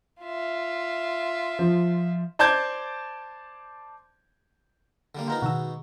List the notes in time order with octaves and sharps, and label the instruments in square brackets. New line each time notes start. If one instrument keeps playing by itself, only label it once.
[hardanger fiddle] F4 E5
[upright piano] F3
[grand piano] C5 D5 A5 D6 G6 G#6
[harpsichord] D3 G3 A#3
[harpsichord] G#3 B3 D#4 [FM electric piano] F4 A#4 A#5 [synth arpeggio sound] G5
[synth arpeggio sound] B2 D#3 E6 [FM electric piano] F#4